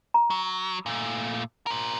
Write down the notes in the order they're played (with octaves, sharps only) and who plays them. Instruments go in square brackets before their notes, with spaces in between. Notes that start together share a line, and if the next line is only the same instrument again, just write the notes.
[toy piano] A#5
[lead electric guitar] F#3
A#2 A3
A#4 C5